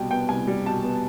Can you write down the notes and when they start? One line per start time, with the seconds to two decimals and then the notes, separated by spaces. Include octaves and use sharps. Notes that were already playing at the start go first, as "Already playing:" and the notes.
Already playing: C2 B2 G3 G5 A5
0.11 B3 G5
0.29 C2 G#5
0.47 G3
0.66 B2 A5
0.83 B3